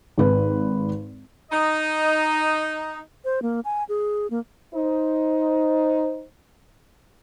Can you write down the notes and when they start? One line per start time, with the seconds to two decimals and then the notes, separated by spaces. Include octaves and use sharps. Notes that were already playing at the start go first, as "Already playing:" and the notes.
0.18 G#1 B4
1.52 D#4 D#5
3.25 C5
3.42 A#3
3.65 G#5
3.89 G#4
4.30 A#3
4.75 D#4 C5